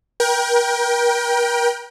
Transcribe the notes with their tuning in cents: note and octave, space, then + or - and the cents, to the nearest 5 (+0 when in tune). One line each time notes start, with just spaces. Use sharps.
A#4 +40 G5 +0